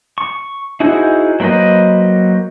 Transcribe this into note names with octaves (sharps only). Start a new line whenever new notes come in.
C#6
D#4 E4 F#4 G#4 C5
F#3 A#3 B4 C5 D#5